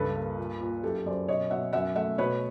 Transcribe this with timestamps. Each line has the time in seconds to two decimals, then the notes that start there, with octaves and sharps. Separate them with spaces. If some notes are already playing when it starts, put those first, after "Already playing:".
Already playing: C#2 G2 A4 B4
0.16 A#3
0.38 A#2
0.61 A#2
0.83 F#2 G4 A4
1.06 F#2 C5 D5
1.28 B2 C#5 D#5
1.50 B2 E5 F#5
1.73 F#2 E5 F#5
1.95 A3 E5 F#5
2.18 B2 B4 C#5